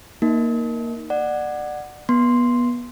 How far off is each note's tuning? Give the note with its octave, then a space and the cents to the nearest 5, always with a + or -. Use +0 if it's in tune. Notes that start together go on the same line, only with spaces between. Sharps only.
A#3 +0 D#4 +0
D5 +25 F#5 +0
B3 -25 C6 +0